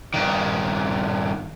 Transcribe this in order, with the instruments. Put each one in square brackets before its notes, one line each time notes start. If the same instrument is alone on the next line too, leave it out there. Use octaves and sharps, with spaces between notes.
[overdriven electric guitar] G2 D#3